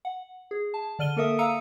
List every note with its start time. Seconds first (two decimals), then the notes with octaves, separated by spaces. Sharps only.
0.05 F#5
0.51 G#4
0.74 A5
0.99 D3 D5 F6 D#7 G7
1.17 A#3 A4 A#4 E5 D#6
1.39 F5 A#5 E6 C#7 D#7